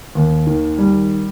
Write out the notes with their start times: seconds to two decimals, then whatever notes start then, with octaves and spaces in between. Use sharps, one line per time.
0.15 D#2
0.47 D#3
0.78 G3